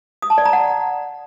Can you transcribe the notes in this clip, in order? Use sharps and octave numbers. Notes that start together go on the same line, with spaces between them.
D#6
A5
D5
A#5
F#5